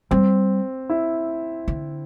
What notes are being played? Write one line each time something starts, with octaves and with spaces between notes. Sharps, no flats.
G3 C4
E4
D3